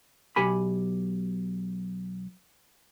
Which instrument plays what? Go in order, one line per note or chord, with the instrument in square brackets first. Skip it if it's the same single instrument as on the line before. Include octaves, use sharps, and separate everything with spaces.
[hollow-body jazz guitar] B1 G4 G#5 B5